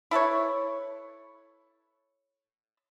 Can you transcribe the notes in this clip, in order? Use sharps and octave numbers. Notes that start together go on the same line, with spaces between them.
E4 A4 B4 C#5